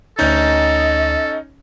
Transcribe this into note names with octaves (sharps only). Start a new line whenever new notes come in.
D2 C#4 D#4 A4 D#5 G6 A6